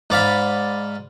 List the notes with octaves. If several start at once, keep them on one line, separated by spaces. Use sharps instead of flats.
G#2 D5 F5 B5